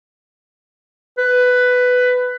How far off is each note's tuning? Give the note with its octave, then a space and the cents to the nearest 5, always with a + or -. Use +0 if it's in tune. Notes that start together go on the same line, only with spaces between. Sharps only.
B4 +10